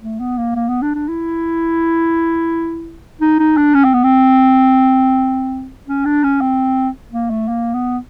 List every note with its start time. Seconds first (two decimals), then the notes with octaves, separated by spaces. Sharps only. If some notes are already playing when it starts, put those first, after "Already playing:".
0.02 A3
0.20 B3
0.38 A#3
0.56 A#3
0.69 B3
0.82 D4
0.95 D4
1.09 E4
3.21 D#4
3.39 D#4
3.57 D4
3.75 C#4
3.84 C4
3.94 B3
4.04 C4
5.88 C#4
6.06 D4
6.24 C#4
6.41 C4
7.12 A#3
7.30 A3
7.48 A#3
7.74 B3